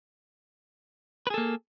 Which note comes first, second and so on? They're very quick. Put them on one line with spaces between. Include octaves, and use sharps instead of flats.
B4 G#4 A4 A#3